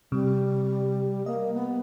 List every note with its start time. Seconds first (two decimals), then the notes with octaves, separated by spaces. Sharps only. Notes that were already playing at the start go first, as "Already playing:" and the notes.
0.12 C3 G3
1.26 A#3 D#5
1.54 B3